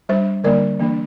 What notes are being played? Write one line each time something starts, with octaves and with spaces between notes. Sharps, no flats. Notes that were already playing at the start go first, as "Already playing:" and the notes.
G3 D4 C5 E5
D3 G3 A#3 D4 A#4 D5
E3 A#3 D4